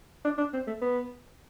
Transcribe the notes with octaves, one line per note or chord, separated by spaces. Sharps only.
D4
D4
C4
A3
B3